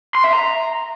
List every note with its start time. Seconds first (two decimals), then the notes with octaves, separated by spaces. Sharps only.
0.15 C6
0.24 E5
0.33 A#5